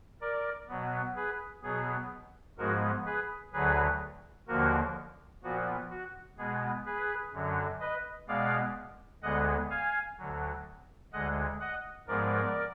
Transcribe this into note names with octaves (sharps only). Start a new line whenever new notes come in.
A#4 D5
B2 F#3 B3
G#4 B4
B2 F#3 B3 G#4
G#2 F3 G#3 B3 F#4 A#4
G#4 B4
D2 D3 F#3 G#4 B4
D#2 D3 F3 A#3 F#4 A#4
A#2 F3 B3 F#4
F#4
B2 G#3 B3 G#4
G#4 B4
F#2 D3 F#3
B4 D#5
B2 G#3 B3 D5 F5
D2 D3 G#3 B3 D#5 F#5
F5 G#5
D2 D3 F#3
D2 D3 G#3 D#5 F#5
D#5 F#5
G#2 F3 G#3 B3 A#4 D5